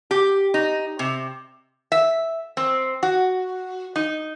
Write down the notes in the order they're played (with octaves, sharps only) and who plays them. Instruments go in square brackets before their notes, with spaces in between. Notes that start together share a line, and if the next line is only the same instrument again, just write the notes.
[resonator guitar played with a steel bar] G4
D#4
C3
E5
C4
F#4
D#4